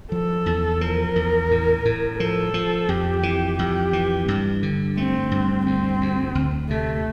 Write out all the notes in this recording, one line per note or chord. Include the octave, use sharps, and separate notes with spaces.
F3 A4
E2
F3 A#4
E2
A2
A2
F3 A4
F3
F2 G4
E3
F2 G4
E3
G2
D3
A3 C4
G2
D2 C4
D2
D2
C3 A3